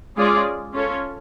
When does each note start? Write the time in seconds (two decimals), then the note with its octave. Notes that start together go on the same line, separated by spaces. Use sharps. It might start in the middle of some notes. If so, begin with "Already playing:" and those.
0.17 G#3 C#4 F4 G#4 D5
0.73 C#4 F4 A4 C#5